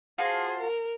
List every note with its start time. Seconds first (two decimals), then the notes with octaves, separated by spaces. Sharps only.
0.18 F4 F#4 G#4 C5 A5
0.59 A#4